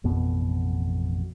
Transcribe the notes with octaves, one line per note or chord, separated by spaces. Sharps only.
A1 F2 B2 B3